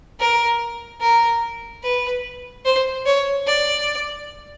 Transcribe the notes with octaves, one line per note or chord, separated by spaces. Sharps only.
A#4
A#4
B4
C5
C#5
D5